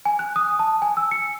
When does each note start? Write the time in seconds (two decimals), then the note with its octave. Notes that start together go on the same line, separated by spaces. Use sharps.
0.05 G#5
0.19 F#6
0.36 D#6
0.59 A5
0.82 G#5
0.97 E6
1.11 C#7